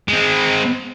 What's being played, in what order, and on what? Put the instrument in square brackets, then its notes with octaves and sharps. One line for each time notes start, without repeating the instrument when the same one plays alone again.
[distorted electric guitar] G#3 C4